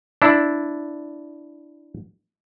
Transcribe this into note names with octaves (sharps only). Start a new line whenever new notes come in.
D4 E4